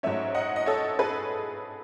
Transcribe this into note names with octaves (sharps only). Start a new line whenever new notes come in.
G#2 F#3 A3 C#4 C#5 E5
D#5 F#5
D#5
A4 C#5
G#4 B4